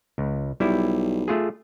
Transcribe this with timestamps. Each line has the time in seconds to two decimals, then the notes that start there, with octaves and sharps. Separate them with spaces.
0.18 C#2
0.60 B1 G3 E4
1.28 A3 F4 G#4